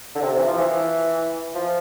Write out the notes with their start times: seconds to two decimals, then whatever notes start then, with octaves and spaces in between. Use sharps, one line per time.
0.15 D3
0.22 C3
0.37 E3
0.47 F3
0.58 E3
1.55 F3